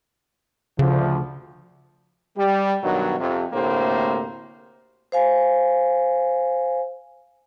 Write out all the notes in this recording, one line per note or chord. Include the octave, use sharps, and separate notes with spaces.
D2 C#3 F3
G3
G2 B2 D#3 F#3
F2 C3
D2 A2 C3 A#3 C5
C5 F5 G#5